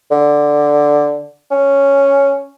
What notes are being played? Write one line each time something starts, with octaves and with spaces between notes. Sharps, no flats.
D3
C#4